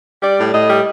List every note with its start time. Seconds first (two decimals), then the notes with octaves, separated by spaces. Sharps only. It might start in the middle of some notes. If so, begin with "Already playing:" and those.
0.21 G3 D5
0.38 A2
0.53 A2 D#5
0.69 G3